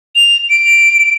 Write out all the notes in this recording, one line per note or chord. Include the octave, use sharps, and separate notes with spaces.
F7
D7